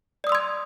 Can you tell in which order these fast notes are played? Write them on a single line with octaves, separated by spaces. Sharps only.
D5 D#6 E6 C6 G#6